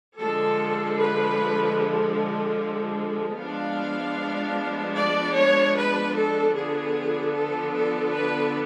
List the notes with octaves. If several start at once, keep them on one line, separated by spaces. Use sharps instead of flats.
D3 F3 G#3 A4
B4
F3 G#3 B3 D4 F5
D5
C#5
B4
A4
D3 F3 B3 D4 G#4
A4
A4
B4